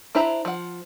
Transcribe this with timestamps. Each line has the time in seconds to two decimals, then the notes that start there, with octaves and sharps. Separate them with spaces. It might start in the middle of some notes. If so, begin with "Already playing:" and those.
0.15 D4 E4 C5 E5 A#5
0.45 F3 F#5